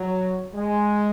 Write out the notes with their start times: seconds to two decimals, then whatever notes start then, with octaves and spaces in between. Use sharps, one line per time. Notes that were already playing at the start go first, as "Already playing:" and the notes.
Already playing: F#3
0.54 G#3